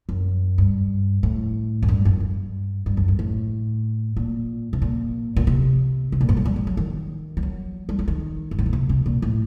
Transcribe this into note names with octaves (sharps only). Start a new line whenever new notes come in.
F#2
G2
A2
F#2
G2
F#2
G2
G2
F#2
G2
A2
A#2
C3
A#2
A#2
C3
C3
A#2
G2
F#3
G3
G3
F#3
D#3
G3
F#3
G3
F#3
D#3
G2
A2
A#2
C3
C3
A#2
A2